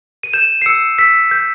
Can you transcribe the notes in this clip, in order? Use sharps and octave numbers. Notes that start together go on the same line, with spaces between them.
D#7
G6 E7
C7
E6 C#7
E6 B6
G6